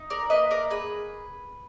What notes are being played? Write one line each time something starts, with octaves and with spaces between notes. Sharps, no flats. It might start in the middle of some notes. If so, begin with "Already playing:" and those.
Already playing: D#4
A#4 D5
A#3 B4 D#5
A#4 D5
G#4 B4